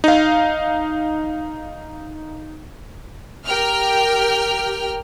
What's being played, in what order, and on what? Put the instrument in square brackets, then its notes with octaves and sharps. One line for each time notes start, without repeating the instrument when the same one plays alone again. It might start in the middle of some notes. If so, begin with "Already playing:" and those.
[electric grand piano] D#4 F5
[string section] G4 A#4 G5 F6